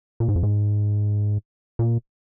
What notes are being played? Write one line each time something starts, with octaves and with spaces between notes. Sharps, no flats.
A#2
G#2
F2
G#2
A#2